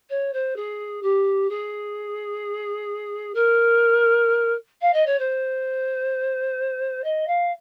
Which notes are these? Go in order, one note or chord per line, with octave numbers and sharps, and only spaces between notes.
C#5
C5
G#4
G4
G#4
A#4
F5
D#5
C#5
C5
D#5
F5